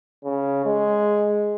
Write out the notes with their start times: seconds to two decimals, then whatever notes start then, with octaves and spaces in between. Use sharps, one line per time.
0.25 C#3
0.65 G#3